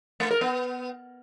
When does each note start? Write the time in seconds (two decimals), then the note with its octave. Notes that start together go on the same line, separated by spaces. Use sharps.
0.20 A3
0.31 A#4
0.41 B3